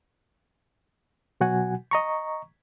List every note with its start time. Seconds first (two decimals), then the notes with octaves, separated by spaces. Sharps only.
1.40 B2 F#3 F#4 F#5 G#5
1.91 D#5 A#5 C#6